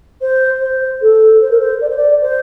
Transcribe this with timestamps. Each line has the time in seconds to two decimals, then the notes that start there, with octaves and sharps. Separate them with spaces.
0.21 C5
0.61 C5
1.01 A4
1.41 C5
1.50 A#4
1.59 C5
1.81 D5
1.88 C5
1.96 D5
2.21 C5